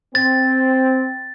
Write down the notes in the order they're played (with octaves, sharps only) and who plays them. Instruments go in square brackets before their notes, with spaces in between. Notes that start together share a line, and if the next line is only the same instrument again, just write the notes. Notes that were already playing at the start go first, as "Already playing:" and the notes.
[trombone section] C4 [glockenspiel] A6